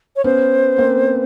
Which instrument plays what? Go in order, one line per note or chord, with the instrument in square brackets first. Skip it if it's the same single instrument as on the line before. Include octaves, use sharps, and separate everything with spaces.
[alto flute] C#5
[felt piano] B3 C#4 [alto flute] C5
[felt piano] A#3 C4